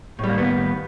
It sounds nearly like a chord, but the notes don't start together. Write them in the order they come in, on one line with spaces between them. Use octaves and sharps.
A2 G3 A#3 D#3 B3